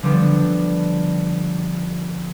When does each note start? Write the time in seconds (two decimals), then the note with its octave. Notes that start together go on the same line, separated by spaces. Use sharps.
0.03 D3 F3 G3 B3 D4